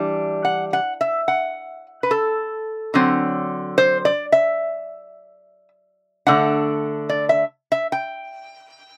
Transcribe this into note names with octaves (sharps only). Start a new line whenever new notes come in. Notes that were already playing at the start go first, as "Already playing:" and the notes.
Already playing: E3 G3 D4
F#5
F#5
E5
F#5
B4
A4
D3 F#3 C4
C5
D5
E5
D3 A3 D4 F#5
D5
E5
E5
G5